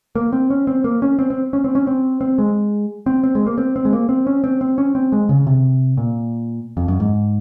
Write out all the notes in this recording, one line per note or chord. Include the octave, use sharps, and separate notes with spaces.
A#3
C4
C#4
C4
A#3
C#4
C4
C4
C#4
C4
C#4
C4
C4
G#3
C4
C4
G#3
A#3
C4
C4
G#3
A#3
C4
C#4
C4
C4
C#4
C4
G#3
C#3
C3
A#2
F2
F#2
G#2